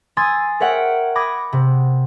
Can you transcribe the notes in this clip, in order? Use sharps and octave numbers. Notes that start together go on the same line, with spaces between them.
G#5 C6 D#6 E6 G#6 A6
A#4 C#5 E5 F#5 G5
B5 D6 D#6 G#6 A#6
C3